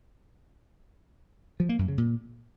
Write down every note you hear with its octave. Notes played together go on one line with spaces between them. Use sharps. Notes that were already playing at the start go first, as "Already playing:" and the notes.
F3
A#3
F#2
C#3
A#2